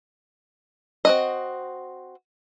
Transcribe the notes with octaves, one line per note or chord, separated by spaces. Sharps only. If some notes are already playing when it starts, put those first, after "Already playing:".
C4 F#4 D#5